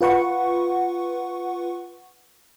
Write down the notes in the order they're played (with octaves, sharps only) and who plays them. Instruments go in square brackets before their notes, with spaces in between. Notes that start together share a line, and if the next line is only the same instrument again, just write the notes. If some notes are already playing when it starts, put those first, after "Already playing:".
[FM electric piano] F4 B4 F#5 C#6